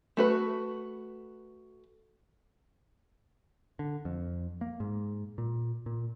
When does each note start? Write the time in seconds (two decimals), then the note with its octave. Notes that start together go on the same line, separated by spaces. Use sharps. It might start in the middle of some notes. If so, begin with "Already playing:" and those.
0.17 A3 F#4 B4
3.79 D3
4.05 F2
4.61 A#3
4.80 G#2
5.38 A#2
5.86 A#2